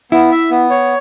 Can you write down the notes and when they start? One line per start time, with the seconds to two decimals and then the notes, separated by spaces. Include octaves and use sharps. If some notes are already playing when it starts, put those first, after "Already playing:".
0.12 B3 E4
0.32 E5
0.51 B3
0.70 C#5